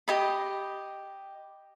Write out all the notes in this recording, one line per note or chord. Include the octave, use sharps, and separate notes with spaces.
G4 D#5 B5